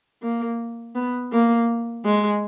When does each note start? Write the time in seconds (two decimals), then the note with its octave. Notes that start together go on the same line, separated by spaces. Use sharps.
0.22 A#3
0.95 B3
1.32 A#3
2.05 G#3